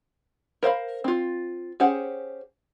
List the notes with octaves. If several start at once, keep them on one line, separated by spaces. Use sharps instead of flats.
A#4 C5 F5 B5
C4 F4
C#4 G4 G#4 C5 F#5